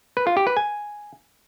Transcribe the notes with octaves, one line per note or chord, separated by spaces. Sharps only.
B4
F4
G4
B4
G#5